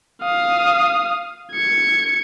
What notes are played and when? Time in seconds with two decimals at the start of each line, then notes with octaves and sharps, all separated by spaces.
0.22 F5 D#6
1.52 G#6 C#7